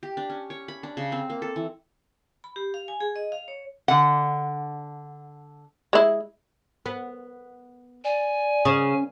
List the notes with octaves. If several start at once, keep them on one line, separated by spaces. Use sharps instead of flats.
G4
D4
C#4
C#5
B5
D4
C#3
C4
A#3
A4
E3
B5
G4
F5
G#5
G#4
D#5
F5
C#5
D3 F#5
G#3 E4
B3
D5 G#5
C#3 C#4